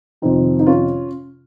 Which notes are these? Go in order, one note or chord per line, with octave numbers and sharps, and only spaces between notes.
F2 C3 D#3 C4 D#4
D#4
C#4 F4